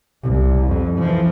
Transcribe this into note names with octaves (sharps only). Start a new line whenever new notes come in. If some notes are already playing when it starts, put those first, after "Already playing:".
C2
F2
E3 F3